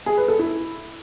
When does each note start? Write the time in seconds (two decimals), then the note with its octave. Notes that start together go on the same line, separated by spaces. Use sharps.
0.06 G#4
0.17 B4
0.28 A4
0.39 E4